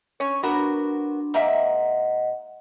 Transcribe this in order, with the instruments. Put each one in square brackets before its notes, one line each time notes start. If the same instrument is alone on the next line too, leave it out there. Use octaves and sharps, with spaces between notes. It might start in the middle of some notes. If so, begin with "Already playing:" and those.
[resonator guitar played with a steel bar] C#4 C#5
[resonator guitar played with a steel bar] B3 F#4 A#4 [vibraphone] D4 C6
[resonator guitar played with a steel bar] G#2 A#3 E5 [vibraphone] D#5 F#5